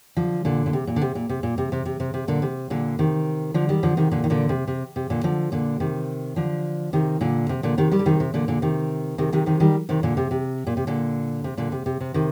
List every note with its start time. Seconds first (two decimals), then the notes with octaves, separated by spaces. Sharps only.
0.16 D3 F3
0.45 A#2 D3
0.66 A#2
0.73 C3
0.87 A#2
0.96 D3
1.01 C3
1.15 A#2
1.29 C3
1.43 A#2
1.58 C3
1.72 C3
1.85 C3
2.00 C3
2.14 C3
2.28 A#2 D3
2.42 C3
2.70 A#2 D3
2.99 C3 D#3
3.54 D3 F3
3.69 D#3 G3
3.83 D3 F3
3.97 C3 D#3
4.11 A#2 D3
4.24 D#3
4.30 A#2 D3
4.49 C3
4.68 C3
4.96 C3
5.10 A#2 D3
5.24 D3 F3
5.52 A#2 D3
5.80 C3 D#3
6.36 D3 F3
6.93 C3 D#3
7.21 A#2 D3
7.49 C3
7.63 A#2 D3
7.78 C3 D#3
7.91 D#3 G3
7.99 D3
8.06 C3 D#3
8.20 C3
8.34 A#2 D3
8.48 A#2 D3
8.62 C3 D#3
9.18 C3 D#3
9.33 C3 D#3
9.46 C3 D#3
9.60 D#3 G3
9.89 C3 D#3
10.03 A#2 D3
10.17 C3
10.31 C3
10.67 A#2
10.77 C3
10.87 A#2 D3
11.44 C3
11.57 A#2 D3
11.72 C3
11.86 C3
12.00 C3
12.14 C3 D#3